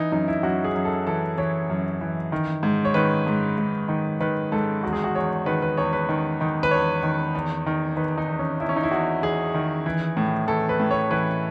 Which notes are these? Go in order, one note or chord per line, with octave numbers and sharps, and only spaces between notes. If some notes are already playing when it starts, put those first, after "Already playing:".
Already playing: E3 D#4
F#2 D#4
E4
F#2 F#4
G#4
F#2
A4
E3 A4
E3 C#5
F#2
E3
D#3
G#2
C#5
D#3 B4
G#2
G#2
D#3
D#3 B4
G#2 A4
E2 F#4
G#4
F#4
E2 C#5
D#3 B4
B4
E2 C#5
B4
D#3
D#3
B4
E2 C#5
D#3
E2
D#3
D#3 B4
D#4
E2
C#4
E2 E4
C#4
D#4
E4
E2 F#4
E2 G#4
D#3
E3
A2
E3 A4
B4
A2
C#5
E3 B4